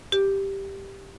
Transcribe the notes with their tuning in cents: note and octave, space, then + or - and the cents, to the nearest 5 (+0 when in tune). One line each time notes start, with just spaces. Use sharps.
G4 +0